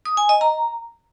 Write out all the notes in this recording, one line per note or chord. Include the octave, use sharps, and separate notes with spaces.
D#6
G#5
D#5
A#5